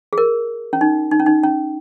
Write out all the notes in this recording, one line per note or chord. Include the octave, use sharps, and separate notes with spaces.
G#4
A#4
C#4
D#4
D#4
C#4
D#4
C#4